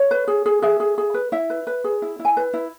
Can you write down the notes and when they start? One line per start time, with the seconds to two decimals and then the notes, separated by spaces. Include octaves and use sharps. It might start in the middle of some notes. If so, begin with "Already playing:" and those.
Already playing: C#5
0.11 B4
0.28 G#4
0.46 G#4
0.62 G#4 E5
0.80 G#4
0.98 G#4
1.14 B4
1.32 E4 E5
1.50 B4
1.67 B4
1.84 G#4
2.02 E4
2.19 E4
2.25 G#5
2.37 B4
2.54 E4